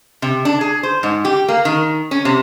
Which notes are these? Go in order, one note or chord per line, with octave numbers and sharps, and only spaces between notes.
C3
D4
G#4
C5
G#2
G4
A#3
D#3
C#4
C3